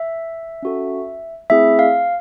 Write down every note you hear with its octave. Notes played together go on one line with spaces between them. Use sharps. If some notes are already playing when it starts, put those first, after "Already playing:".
Already playing: E5
C#4 F#4 A4
A3 C4 E4 G#4 E5
F5